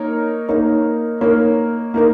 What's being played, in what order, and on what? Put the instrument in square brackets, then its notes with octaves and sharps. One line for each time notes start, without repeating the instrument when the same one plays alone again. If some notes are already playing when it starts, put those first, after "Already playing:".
Already playing: [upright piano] A#3 D#4 A#4 C#5
A#3 D#4 A#4 C#5
A#3 D#4 A#4 C#5
A#3 D#4 A#4